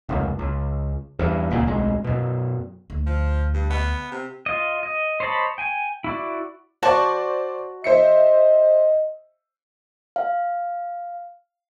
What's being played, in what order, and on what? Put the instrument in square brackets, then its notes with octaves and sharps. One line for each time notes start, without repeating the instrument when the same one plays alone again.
[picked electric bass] F1 C#2 F#2
C#2
E2 G2
D#1 C#2 A#2
D1 B1 G#3
F#2 B2
[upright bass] D2
[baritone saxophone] F3
G2
B3
C3
[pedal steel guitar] F4 D#5
D#5
C5 C#5 D#5 A5 B5
G5 G#5
E4 F#4 D5
[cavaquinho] F#4 A5 C#6 [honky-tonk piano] C5 D5
[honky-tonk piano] C5 E5 C#7 [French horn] D#5
[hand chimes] F5